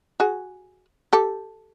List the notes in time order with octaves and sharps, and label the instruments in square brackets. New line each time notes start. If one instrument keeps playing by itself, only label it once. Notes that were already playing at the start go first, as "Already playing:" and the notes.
[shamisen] F#4 G#4
G4 A4